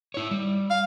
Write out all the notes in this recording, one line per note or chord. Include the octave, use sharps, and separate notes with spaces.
E4 C#5
G3
F5